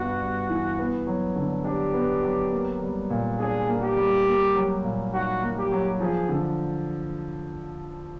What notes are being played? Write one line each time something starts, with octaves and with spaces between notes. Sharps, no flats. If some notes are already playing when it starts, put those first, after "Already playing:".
Already playing: G2 G3 B3 F#4
G3
E3
B3
F#3
D3
D4 G4
B3
F#3
A#3
G3
A#2
D4 G#4
A#3
G4
G3
A#3
F#3
A#2
D#4 F#4
A#3
G4
F#3
F3 G#4
D3